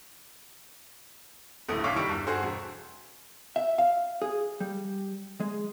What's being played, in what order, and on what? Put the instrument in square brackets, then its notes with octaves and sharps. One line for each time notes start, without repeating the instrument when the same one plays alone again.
[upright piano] D#1 A#1 A2 D3 D#6
C2 C#4 C#5 F5 D6 B6
D#3 G3 C#6 E6 D7
E2 G2
G2 F#4 G#4 A4 C5
E1
[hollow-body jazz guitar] E5
F5
G#4
G3
G#3